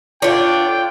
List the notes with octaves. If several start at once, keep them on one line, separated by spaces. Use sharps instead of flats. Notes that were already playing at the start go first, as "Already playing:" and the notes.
D3 D4 F4 C#5 G5